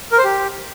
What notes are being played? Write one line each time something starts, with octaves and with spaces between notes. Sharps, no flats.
A#4
C5
G4